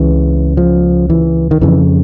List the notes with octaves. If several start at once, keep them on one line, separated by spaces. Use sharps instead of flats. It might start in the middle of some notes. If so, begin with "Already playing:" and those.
Already playing: C#2 C#3 E3
F3
E3
D#3
F2 C#3 E3